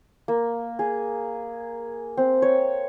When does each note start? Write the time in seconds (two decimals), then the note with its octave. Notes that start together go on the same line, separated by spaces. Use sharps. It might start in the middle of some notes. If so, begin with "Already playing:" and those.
0.28 A#3
0.79 G#4
2.17 C4
2.42 C#5